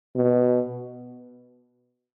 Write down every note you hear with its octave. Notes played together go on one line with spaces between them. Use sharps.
B2